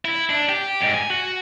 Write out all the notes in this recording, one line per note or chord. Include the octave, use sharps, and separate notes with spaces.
E4
D4
G4
E2 G#2
G#5
F#4